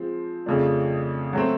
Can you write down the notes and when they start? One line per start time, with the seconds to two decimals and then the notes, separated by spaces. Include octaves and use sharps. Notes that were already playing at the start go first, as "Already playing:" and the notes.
Already playing: F3 G#3 C4
0.46 F2 C#3 F3 A3 D4
1.33 F#3 A3 C4